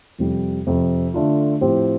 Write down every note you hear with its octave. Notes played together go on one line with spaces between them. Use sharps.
F2 C3 G3
F2 C3 F3
D3 A3 D4 F4
A2 F3 C4 G4